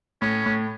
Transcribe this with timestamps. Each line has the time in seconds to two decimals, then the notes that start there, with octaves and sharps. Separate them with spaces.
0.21 A2 C#4
0.46 A2